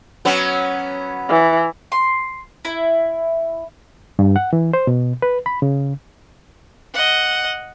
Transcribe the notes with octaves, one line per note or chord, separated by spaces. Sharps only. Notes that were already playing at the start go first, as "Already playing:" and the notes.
F#3 B3 C#4
E3
C6
E4
G2
F#5
E3
C5
B2
B4
B5
C#3
D#5 F#5